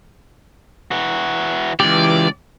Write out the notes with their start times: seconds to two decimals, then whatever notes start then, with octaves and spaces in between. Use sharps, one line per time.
0.91 E3 F#4
1.80 C#2 E3 G4 D5